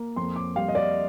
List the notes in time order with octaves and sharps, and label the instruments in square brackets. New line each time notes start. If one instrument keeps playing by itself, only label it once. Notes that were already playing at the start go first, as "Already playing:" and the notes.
Already playing: [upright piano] A#3
F2 C6
D6
G3 F5
D#5
D5